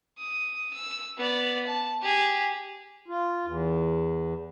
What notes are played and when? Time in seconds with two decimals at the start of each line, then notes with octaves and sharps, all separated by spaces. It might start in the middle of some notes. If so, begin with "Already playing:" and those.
0.19 D#6
0.74 E6
1.18 B3 D5
1.67 A5
2.02 G4 G#4
3.08 F4
3.46 E2